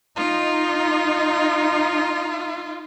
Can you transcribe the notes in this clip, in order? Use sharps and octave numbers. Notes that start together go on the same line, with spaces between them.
D#4 F4